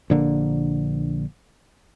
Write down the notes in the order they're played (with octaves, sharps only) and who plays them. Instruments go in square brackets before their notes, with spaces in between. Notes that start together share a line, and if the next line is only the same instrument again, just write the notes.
[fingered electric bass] A#1 D3 A#3